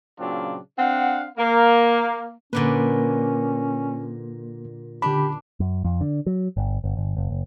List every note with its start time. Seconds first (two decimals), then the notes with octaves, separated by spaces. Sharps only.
0.18 A#2 C#3 F#3 C4 D4 F4
0.78 C4 D4 F5 F#5
1.38 A#3
2.53 A#2 D3 A#3 C#4 B4
5.02 D3 D4 G4 B5
5.60 F#2
5.84 F2
6.01 D3
6.26 F#3
6.57 G1
6.84 G1
6.97 G1
7.17 F#1
7.30 F#1